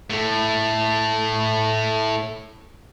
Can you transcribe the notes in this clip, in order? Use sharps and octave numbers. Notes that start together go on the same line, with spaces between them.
A2 A3